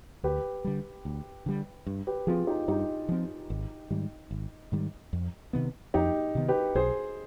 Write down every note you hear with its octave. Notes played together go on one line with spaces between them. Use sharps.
D2 G4 B4
D3 G3
D2
D3 G3
G2
G4 B4
F3 C4 F4 G#4
D#4 G4
G2 D#4 G4
F3 C4
G#1
G#2 D#3 G3
G#1
G#2 D#3 G3
F2
C3 D#3 B3
F2 D#4 G4
C3 D#3 B3
G4 B4
B1 G#4 C5